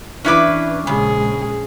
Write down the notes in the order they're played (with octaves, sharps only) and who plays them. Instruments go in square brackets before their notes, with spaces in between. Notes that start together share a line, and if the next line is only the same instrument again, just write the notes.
[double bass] E3 [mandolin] C#4 D6 [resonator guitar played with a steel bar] D4 E4 B4
[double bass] A#1 G#3 [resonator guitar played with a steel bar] C#3 [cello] G#4